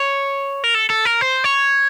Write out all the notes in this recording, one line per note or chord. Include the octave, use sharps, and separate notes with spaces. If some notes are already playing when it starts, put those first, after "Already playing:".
Already playing: C#5
A#4
A4
A4
A#4
C5
C#5